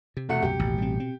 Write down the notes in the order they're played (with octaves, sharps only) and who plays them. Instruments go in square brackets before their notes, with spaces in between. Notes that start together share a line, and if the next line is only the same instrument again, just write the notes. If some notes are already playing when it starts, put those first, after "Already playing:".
[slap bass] C3
[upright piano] E2 A3 F#5 [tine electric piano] B2 C#7
[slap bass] C2 F#2 [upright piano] G4
[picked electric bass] A1 [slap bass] D#2
[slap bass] G3 C4
C4